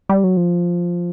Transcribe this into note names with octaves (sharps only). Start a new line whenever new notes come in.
G3
F#3
F3